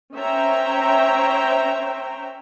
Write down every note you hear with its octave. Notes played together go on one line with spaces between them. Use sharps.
C#4 C5 C#5 E5 G5 A#5